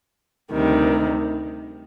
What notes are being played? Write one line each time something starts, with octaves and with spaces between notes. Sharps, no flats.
D2 C3 D#3 G3